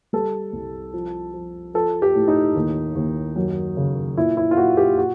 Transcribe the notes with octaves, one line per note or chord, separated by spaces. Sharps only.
G3 A4
C2
F3
F3
F3 A4
G4
A2
D#4
D#2
D#2
F#2
C#3
A#2 E4
E4
F4
A#2 F#4
G4
F#4